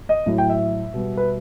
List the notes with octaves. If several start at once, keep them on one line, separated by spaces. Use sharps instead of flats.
D#5
A2 F#3 A3
G5
E5
B2 G3 B3
B4